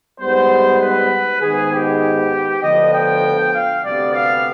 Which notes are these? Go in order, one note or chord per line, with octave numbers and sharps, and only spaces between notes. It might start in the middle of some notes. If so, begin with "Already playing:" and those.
G#2 G3 B3 C5
B4
G#2 D#3 B3 G#4
G4
D2 D3 F3 B3 D#5
G5
F5
D2 C3 G3 B3 D5
F5